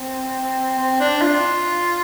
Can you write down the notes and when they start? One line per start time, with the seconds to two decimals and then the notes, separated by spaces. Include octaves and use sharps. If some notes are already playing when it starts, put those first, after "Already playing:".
Already playing: C4
0.79 C4
1.01 D4
1.21 F4